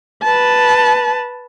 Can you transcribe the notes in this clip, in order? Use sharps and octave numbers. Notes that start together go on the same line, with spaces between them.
B4 A5